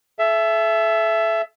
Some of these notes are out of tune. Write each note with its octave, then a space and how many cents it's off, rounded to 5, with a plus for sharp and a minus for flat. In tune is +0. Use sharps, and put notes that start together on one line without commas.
A4 -35 E5 +15